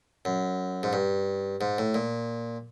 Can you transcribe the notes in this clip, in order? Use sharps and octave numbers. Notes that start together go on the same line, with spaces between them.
F#2
G#2
G2
G#2
A2
A#2